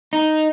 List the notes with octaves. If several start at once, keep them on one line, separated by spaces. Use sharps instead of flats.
D#4